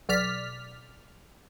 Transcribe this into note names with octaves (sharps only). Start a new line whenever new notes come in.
B1 D5 F6 B6